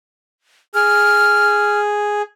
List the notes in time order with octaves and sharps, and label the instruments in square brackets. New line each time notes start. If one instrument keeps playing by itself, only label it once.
[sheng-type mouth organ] G#4 [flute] F6